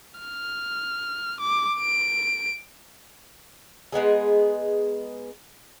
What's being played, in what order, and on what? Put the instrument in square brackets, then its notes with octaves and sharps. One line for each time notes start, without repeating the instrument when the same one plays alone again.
[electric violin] F6
D6
D7
[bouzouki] G#3 B3 D#4 G#4